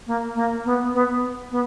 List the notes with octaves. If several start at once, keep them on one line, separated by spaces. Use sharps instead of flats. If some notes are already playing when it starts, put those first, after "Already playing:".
A#3
A#3
B3
B3
B3